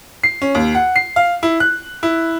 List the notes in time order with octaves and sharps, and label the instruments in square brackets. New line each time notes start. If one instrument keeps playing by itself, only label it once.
[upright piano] C7
C#4
D#2
F#5
C7
F5
E4
F#6
E4